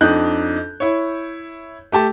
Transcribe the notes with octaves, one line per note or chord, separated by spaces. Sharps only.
F2 D4 D#4 F#6 G6
E4 C#5
A3 G4 A5